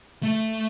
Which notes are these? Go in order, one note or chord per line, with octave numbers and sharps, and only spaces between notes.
A3